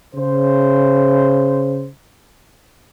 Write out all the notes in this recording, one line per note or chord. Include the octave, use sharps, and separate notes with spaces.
C#3 C5